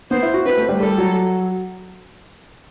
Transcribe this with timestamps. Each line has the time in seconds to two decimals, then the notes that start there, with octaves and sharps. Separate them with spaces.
0.11 B3 C5
0.23 E4
0.34 F#4
0.45 C4 B4
0.57 A3
0.69 G3
0.80 G3 A4
0.98 F#3